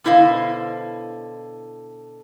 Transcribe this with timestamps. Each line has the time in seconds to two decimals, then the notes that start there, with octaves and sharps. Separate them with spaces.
0.04 B2 D3 E4 C5 D#5 F5